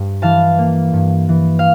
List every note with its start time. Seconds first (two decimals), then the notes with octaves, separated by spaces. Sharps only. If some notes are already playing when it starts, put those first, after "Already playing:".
Already playing: G2
0.22 E3 F5 A5
0.58 A#3
0.93 G2
1.29 E3
1.59 F5